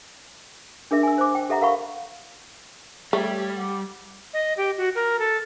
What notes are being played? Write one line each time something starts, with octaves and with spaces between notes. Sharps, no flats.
D4 G#4 A#4 E5
G#5 E6
C5 D6
G5
G4 A4 E5 F#5 A#5
A#4 F5 F#5 B5 C#6
G3 A3 G4 A4 C#5
F#5 D6
D#5
G4
F#4
A#4
A4